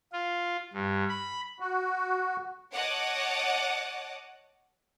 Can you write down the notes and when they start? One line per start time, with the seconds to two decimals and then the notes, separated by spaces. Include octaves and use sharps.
0.13 F4
0.73 G2
1.09 B5
1.60 F#4
2.75 C#5 D#5 F#5 A5 D6